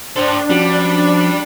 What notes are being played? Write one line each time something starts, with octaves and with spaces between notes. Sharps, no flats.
D4 A4 C5 G5
F3 G3 C#4 F4 F#4